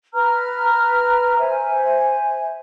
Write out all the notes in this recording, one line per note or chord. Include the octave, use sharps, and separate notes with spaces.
B4 A#5 F6
C5 E5 G#5